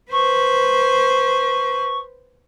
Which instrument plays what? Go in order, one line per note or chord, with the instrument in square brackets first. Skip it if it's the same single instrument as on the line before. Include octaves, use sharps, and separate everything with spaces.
[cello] B4 C5 [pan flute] C#6